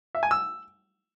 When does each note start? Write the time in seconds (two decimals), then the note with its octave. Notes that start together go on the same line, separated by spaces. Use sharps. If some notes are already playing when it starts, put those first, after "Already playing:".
0.15 E5
0.23 G#5
0.31 E6